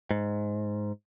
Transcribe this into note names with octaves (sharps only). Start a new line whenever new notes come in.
G#2